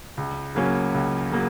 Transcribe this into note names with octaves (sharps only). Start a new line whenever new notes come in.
C#2
C#3 F#3 A#3 C#4
C#2
C#3 F#3 A#3